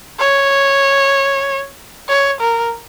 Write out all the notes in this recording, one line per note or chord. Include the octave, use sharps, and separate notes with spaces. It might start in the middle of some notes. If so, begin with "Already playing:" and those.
C#5
C#5
A#4